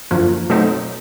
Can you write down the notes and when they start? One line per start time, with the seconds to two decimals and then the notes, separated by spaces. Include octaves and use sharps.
0.11 F#2 D3 F3 A#3
0.49 B2 F#3 A3 C4 D#4